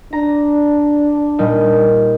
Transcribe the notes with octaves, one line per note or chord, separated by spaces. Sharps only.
D4 A#5
A#2 G3 D#4